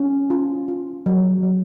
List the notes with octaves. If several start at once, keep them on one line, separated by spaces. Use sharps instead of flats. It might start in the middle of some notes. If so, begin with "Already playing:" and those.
Already playing: C#4
F4
F4
F#3
F#3